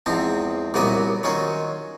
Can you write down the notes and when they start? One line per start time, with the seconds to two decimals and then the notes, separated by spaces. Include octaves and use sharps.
0.06 E2 G#2 F3 C4
0.74 C2 A#2 F#3 B3 D#5 D6
1.23 D#3 F#3 C#4 F4